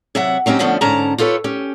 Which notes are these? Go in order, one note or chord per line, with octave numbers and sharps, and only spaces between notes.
C3 F#3 E5 F#5
F#3 C4 C#4 D#4 G4
D3 F3 A3 B3 C#4 D4
G#2 D3 C#4 A5 A#5
F4 G4 A4 B4 C#5
C#4 G4